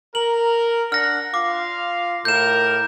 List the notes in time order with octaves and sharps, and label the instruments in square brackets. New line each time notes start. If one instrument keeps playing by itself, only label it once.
[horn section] A#4 [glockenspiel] F#7
[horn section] D4 F#5 [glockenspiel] F6 A#6
[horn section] F4 F5 [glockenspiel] D6
[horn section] A2 A#4 [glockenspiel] G6 E7